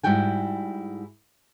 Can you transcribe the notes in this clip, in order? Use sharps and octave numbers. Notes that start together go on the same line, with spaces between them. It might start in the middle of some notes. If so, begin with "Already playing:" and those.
G#2 G3 E4 F#4 G5 G#5